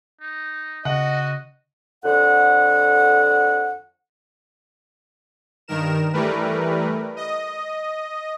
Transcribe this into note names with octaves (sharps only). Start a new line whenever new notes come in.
D#4
C#3 F#4 D#5 F#5
F2 D3 F#5
G2 D#3 A#4 E7
E3 G3 A3 A#4 B4
D#5